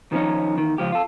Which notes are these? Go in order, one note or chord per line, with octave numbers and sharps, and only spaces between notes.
D#3 F3 G3 B3 C#4 D#4
E2 D#3
C#2 F3 G4
F4 A4